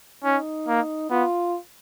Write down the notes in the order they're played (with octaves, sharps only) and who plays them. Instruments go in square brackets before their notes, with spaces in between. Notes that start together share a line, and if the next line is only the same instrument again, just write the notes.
[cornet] C#4 [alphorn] D#4
[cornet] A#3
[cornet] B3 [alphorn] F4